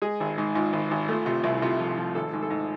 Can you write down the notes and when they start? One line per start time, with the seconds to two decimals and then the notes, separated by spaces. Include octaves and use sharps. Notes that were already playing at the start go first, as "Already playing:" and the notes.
0.02 G#3 G#4
0.20 G#1
0.38 G#2
0.55 G#2 F4
0.73 G#1
0.91 G#1
1.09 A3 F4
1.26 C3 F4
1.44 C2 E4
1.62 C3 F4
1.79 F3
1.97 F3
2.15 G#1 A4
2.33 G#2
2.43 A4
2.50 G#2